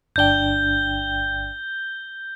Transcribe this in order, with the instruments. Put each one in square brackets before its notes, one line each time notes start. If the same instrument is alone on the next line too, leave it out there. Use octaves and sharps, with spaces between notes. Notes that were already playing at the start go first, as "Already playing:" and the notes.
[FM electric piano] G1 D4 G5 [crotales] G6 G7